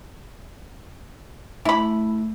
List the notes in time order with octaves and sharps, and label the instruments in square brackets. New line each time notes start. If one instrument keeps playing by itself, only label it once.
[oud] A3 [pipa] E4 B5